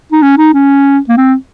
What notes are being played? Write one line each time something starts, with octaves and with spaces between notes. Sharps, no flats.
D#4
C#4
D#4
C#4
A#3
C4